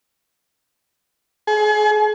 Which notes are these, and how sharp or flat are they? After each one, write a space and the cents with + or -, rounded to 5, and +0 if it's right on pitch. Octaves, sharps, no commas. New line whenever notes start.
G#4 +35